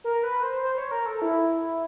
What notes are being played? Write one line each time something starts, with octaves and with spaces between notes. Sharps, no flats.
A#4
B4
C5
C5
C#5
A#4
A4
E4